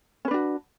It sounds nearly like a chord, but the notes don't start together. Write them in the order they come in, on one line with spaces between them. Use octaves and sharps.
C#4 B4 D4 F#4